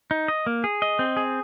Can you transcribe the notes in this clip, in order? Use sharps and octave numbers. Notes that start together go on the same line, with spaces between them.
D#4
D#5
A#3
G#4
D#5
C4
G#4